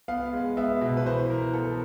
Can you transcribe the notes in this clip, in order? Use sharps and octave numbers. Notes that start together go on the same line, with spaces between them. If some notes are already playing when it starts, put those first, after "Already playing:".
B3 F5
G#3
B3 E5
B2
B4
E3 C5
E3 A#4
B3 A4